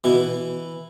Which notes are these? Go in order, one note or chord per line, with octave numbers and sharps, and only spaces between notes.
B2 E3 E4